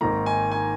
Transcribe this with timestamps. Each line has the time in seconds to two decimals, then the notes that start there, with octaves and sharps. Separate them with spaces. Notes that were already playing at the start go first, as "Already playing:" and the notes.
0.01 G#1 G#2 D#3 A#3 A#5
0.26 G#5
0.51 G#5